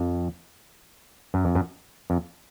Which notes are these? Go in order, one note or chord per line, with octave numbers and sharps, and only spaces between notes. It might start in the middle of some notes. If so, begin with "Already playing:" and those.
Already playing: F2
F#2
F2
F#2
F2